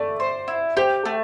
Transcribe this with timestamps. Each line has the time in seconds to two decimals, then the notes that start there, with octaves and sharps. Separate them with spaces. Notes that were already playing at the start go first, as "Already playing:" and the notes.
Already playing: A3 D5
0.20 C5
0.48 E4
0.77 G4 C5
1.05 A3